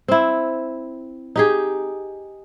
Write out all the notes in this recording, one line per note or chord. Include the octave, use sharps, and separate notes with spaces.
C4 E4
D#4 G4 G#4